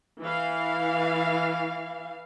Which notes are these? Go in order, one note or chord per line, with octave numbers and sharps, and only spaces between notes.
E3 F5